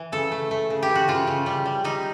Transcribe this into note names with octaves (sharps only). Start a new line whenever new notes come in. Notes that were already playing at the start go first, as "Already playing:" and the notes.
Already playing: E3
C#3 A4
A3
A3
C#3
G4
E3
F#4
C#3 F4
C#3
G3
G3
G3 D#4